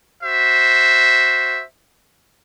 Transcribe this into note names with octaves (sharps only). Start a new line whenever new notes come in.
F#4 C5 E5